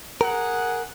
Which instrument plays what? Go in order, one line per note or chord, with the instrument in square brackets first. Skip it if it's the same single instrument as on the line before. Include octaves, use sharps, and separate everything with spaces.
[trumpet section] G#4 F#5 [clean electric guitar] A#4